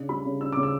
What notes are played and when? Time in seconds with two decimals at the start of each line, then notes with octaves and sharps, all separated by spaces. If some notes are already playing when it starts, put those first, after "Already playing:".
Already playing: C#3 D4
0.09 G3 B5
0.25 C#3
0.41 D4 E6
0.52 C#3 D6
0.63 E6